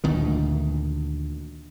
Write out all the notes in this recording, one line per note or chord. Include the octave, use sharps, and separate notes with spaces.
D2 A#2 D#3